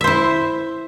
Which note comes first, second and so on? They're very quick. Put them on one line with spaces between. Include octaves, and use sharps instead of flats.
E5 C5 E4